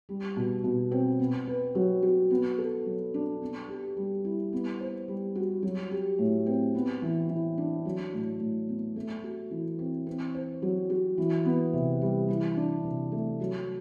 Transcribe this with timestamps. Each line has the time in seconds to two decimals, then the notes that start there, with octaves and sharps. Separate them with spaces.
0.09 G3
0.36 B2
0.64 B2
0.92 C4
1.20 B3
1.47 B4
1.75 F#3
2.03 F#4
2.31 B3
2.58 A4
2.86 F#3
3.14 D4
3.42 B3
3.69 G4
3.97 G3
4.25 E4
4.53 B3
4.81 C5
5.08 G3
5.35 F#4
5.63 F#3
5.91 G4
6.18 A2
6.46 C4
6.75 B3
7.02 E3
7.29 E3
7.58 D4
7.85 F#3
8.13 A2
8.40 A2
8.69 B3
8.96 A3
9.23 F#4
9.51 E3
9.79 C4
10.07 C4
10.35 C5
10.62 F#3
10.90 F#4
11.18 E3
11.45 B3
11.73 C3
12.02 G3
12.28 E3
12.57 D4
12.84 C3
13.12 A3
13.40 F#3